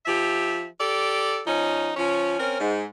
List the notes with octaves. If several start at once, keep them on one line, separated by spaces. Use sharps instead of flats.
F3 G4 E5
G4 A4 D5
F3 C#4 D#4
F3 C#4
C4 C#4 A#4
G#2